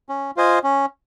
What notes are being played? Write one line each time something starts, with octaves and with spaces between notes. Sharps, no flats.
C#4
F4 C5 D#5 G#5
C#4